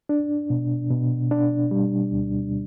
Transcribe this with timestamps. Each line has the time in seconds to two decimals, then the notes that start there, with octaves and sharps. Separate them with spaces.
0.09 D4
0.50 B2
0.90 B2
1.31 D4
1.71 G3
2.12 D2